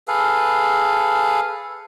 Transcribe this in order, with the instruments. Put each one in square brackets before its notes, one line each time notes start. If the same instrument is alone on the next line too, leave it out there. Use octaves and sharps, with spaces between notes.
[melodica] G#4 A4 B4 F5